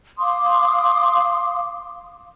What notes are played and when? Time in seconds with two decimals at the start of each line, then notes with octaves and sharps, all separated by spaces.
0.18 F5 C6 D6 D#6